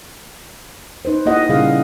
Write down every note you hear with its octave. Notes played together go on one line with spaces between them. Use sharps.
D#4 B4 C5
A#3 E4 F4 G4 D#5 F#5
A#2 C#3 G3 E4 G#4 F5